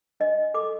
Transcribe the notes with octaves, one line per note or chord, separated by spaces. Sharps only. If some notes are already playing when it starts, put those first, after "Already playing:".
D4 D#5
D4
A4 D6